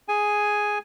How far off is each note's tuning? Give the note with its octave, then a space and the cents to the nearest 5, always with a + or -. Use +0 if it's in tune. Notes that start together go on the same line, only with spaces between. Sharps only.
G#4 +0 G#5 +0